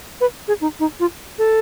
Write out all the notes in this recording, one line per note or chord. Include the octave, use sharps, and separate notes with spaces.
B4
G#4
D#4
D#4
F4
A4